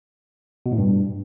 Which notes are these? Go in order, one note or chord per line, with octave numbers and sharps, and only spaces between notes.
B2
A2
G2